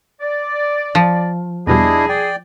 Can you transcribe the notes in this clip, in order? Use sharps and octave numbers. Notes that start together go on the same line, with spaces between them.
D5
F3
E2 B2 G3 D4 E4 G#4 D#5
D5 G5